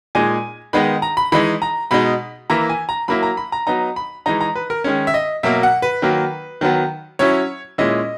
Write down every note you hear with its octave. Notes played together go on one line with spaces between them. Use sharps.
A#2 G#3 D#4 G#5
D#3 G#3 B3 D#4 B5
A#5
B5
E3 G#3 D#4 B5
A#5
B2 G#3 D#4 B5
E3 A#3 E4 A#5
G#5
A#5
F#3 A#3 E4 B5
A#5
B5
A#5
F#3 B3 D#4 A#5
B5
E3 G#3 D#4 A#5
A#5
B4
A#4
D#3 G#3 C#4
E5
D#5
B2 F#3 A#3 E5
F#5
B4
D#3 F#3 A#3
D#3 F#3 B3
F#3 C#4 E4 C#5
A#2 G#3 C#4 E4 D#5